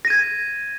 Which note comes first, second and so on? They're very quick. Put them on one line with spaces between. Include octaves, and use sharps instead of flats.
A#6 D#7 G#6